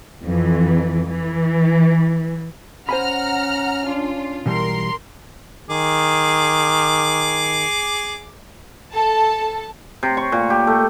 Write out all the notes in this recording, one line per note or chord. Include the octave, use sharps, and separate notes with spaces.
F2 E3
E3
C#4 C5 F#5 G#5 A#5 B5 F6
D4 F4
B1 B2 E3 G3 A#4 C6
D#3 G#4 D6
A4 A5
C3
C#6
A#2
G4
A3